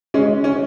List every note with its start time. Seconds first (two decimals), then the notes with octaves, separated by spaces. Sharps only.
0.14 G#3 C#4
0.44 C#4